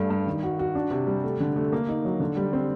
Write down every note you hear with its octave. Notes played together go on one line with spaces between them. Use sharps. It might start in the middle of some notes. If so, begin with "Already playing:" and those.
Already playing: G2 A3
G2
D#3
F#4
F#4
D4
C3
G3
A3
D3
A3
A#3
D#4
F#3
D3
G3
C4